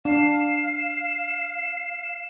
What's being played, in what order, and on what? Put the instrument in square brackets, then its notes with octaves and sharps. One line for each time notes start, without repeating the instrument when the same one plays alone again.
[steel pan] D4 [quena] F5 [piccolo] E7